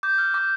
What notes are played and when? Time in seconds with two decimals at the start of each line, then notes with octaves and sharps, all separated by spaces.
0.03 D6 G6
0.18 F6
0.34 D6